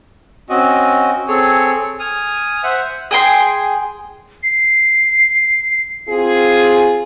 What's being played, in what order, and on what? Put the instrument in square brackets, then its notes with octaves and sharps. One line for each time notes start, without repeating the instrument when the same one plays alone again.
[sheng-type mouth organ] C4 C#4 F#4 D#5
C4 G#4 A4 C#5
G#5 D#6 F6
C5 E5 F#5
[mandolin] G#4 G5 C6
[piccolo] C7
[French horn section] C4 F4 G#4